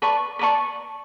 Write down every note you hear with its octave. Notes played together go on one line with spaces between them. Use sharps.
B4 D5 A5 C#6
B4 D5 A5 C#6